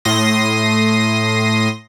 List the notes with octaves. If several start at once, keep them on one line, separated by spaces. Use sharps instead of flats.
A2 C6 D#6 A#6